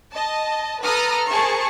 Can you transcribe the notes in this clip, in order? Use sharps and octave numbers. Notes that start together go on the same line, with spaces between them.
D#5 A5
A4 B4 A#5 D#6 F6
G#4 A#4 C5 A5 C#6